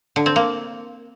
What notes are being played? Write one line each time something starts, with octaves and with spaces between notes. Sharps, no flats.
D3
C4
A#3